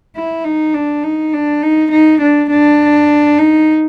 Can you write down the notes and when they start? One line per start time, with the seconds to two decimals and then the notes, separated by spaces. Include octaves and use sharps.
0.16 E4
0.44 D#4
0.74 D4
1.03 D#4
1.33 D4
1.63 D#4
1.92 D#4
2.21 D4
2.50 D4
3.38 D#4